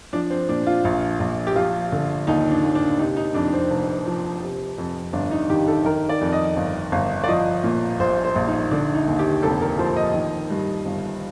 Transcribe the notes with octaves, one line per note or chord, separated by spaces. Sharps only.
F3 D4
C4
A#2 D4
F4
A#1
A#1
G4
F3 F4
D3
D#2 D#4
D4
D#2
D4
C3 D#4
D#4
F2 D4
C4
F1
F3
C3
F2
G1 D4
D#4
D#3 G4
A4
D#3 A#4
D5
F2
D#5
G1
G1
D5
F3 D#5
A#2
A#1 C5
C5
A#1
D#4
D3 D4
D#4
D#2
G4
F1 A4
A#4
F3 C5
D#5
D#3
G2
G1